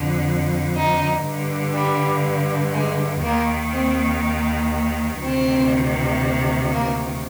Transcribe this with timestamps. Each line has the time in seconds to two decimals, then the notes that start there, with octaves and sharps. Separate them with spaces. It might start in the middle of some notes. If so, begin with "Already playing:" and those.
Already playing: F2 D3
0.75 D#4
1.24 G2 D3
1.74 G3
2.74 G#3
3.23 D#2 D#3 A#3
3.73 C4
5.23 D2 C3 D#3 C4
6.71 A#3